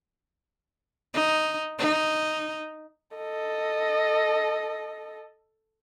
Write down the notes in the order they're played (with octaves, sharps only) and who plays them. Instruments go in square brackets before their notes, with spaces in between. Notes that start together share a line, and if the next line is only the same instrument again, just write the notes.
[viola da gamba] D#4
D#4
[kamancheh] A4 D#5